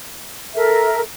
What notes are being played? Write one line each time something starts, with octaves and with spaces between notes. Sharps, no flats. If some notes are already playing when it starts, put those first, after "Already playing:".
A4 A#4 E5